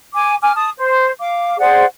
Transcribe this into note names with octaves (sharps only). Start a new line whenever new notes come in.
G#5 D6
G#5 D6 F6
A5 D#6
C5
F5 D6
G#4 C5 D5 F#5